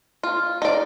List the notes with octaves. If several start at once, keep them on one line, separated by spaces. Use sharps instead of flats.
F4
D#4 D5